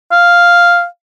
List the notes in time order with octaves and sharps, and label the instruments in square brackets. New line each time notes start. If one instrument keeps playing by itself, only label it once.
[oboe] F5